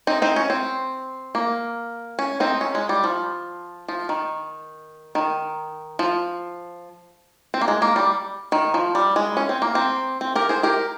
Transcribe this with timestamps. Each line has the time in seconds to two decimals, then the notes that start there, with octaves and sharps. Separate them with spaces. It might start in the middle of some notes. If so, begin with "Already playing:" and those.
0.07 C4 D#4
0.22 C4 D#4
0.36 C#4
0.50 C4
1.35 A#3
2.19 C#4
2.40 C4 D#4
2.61 C#4
2.75 G#3
2.89 G3
3.04 F3
3.88 F3
4.09 D#3
5.15 D#3
5.99 F3
7.54 C4
7.61 A#3
7.68 G#3
7.82 A#3
7.96 G3
8.52 D#3
8.74 F3
8.95 G3
9.16 G#3
9.37 C#4
9.49 C4
9.62 A#3
9.75 C4
10.21 C4
10.36 G4 A#4
10.49 G#4 C5
10.63 G4 A#4